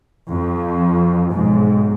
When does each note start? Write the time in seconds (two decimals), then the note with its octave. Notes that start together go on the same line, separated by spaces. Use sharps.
0.30 F2
1.32 B1 G#2